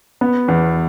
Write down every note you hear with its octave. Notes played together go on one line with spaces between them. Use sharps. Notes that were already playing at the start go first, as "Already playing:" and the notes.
B3
E2